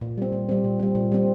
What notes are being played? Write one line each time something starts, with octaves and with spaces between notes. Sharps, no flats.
A#2
G3 C4
A#2
G3 C4
A#2
G3 C4
A#2
G3 C4